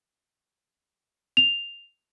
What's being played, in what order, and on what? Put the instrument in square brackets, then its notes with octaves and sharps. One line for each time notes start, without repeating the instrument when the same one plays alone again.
[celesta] F7